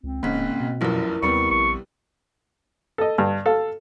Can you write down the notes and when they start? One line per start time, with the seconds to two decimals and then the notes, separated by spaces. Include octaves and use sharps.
0.03 C#2 C4
0.23 D1 G#2 C#3 A#3 B6
0.60 B2
0.81 F1 A#1 F#2 E4 A#4
1.22 D#2 C3 G3 B3 C#6
1.51 A#1 C#6
2.98 A4 D#5
3.18 G2
3.46 A4 F5